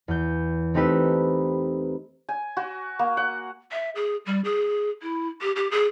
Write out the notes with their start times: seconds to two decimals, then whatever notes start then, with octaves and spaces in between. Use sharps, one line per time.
0.08 E2 G6
0.74 A3 C4 D#4 G4 B4 E6
2.29 G#5
2.57 F#4
2.99 A#3
3.17 F#5
3.72 E5
3.96 G#4
4.26 G3
4.44 G#4
5.02 E4
5.41 G4
5.56 G4
5.71 G#4